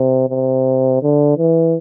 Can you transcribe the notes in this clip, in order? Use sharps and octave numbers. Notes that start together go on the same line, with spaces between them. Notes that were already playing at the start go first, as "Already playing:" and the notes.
Already playing: C3
C3
D3
E3